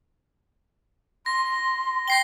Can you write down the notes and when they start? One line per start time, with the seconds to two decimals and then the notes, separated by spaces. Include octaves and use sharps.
1.26 C6 A#6
2.08 G5 A#6 C7 G7